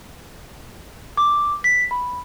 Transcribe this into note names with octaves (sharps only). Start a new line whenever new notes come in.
D6
B6
B5